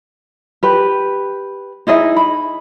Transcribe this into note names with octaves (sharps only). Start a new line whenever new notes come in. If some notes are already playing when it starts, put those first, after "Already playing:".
G4 B4
D#4 E4 G#4 D#5
B5